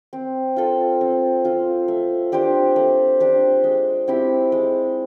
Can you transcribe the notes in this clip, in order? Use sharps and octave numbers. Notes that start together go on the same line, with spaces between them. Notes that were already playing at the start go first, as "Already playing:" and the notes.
C4
F4 A4
C4
F4 A4
A3
D4 G4 C5
A3
D4 G4 C5
G#3
C4 E4 G4
G#3